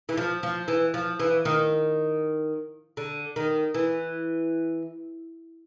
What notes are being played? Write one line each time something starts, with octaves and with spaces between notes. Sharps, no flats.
E3
F3
F3
E3
F3
E3
D#3
D3
D#3
E3